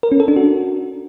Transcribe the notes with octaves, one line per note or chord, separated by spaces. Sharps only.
A#4
C#4
A4
D4
F#4